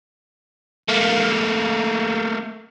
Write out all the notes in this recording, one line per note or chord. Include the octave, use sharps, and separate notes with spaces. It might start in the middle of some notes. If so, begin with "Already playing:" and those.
A3 A#3